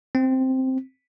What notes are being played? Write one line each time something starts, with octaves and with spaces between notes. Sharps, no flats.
C4